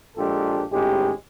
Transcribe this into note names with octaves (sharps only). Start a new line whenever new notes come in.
A#1 G#3 D4 F4 G4 A4
G#1 A2 G#3 C#4 G4